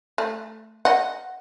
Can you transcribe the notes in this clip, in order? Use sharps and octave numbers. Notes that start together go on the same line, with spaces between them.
A3
D#5 F#5